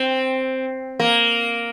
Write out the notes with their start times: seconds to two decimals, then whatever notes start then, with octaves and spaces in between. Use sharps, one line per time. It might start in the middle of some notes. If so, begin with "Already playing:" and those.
Already playing: C4
1.00 A#3